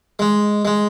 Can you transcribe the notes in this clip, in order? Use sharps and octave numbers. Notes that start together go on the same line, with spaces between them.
G#3
G#3